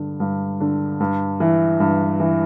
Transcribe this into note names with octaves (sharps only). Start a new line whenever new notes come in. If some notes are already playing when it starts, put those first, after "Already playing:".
Already playing: G2 D3
G2
D3
G2
E3
G2
E3